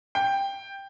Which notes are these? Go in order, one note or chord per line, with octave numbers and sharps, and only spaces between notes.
G5